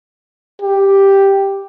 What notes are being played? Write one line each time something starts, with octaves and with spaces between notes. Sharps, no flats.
G4